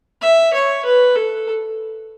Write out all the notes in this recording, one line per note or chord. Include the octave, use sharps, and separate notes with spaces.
E5
C#5
B4
A4